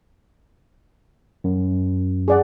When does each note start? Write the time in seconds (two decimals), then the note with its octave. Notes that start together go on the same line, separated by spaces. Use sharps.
1.44 F#2
2.28 G#4 D5 F#5